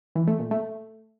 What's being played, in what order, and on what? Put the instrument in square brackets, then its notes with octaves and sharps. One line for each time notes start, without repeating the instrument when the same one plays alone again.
[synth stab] E3
A3
A#2
A3